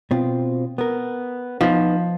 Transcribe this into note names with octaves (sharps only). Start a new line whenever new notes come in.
B2 C4 F4
B3 A#4
F3 B3 D#4